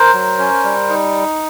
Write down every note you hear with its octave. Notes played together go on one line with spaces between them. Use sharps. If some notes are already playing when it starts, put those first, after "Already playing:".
Already playing: A#4 C5
F#3
C#4
G3
D#4